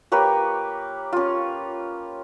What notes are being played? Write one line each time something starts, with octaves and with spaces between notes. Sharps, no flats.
A#3 G4 B4 C#5
C#4 F4